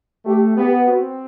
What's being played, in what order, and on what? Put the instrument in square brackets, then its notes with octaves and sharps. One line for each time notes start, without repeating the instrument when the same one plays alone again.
[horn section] A3 [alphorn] G4
[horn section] B3 [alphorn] G4
[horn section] C4 [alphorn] F#4